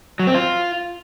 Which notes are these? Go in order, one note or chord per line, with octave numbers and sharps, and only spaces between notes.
F#3
C4
F4